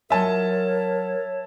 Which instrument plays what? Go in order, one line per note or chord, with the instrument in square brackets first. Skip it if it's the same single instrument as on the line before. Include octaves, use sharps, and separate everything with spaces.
[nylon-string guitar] F#3 F4 D#5 [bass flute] A#4 [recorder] C#5 [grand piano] E5 A5